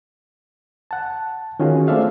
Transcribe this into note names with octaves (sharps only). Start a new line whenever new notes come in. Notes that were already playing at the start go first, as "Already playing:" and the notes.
F#5 A5
D#3 C#4 F4 F#4 G#4
A3 C4 A4 D5 E5 F5